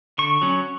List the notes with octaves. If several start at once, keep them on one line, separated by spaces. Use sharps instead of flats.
D3 C#6
F#3 C#4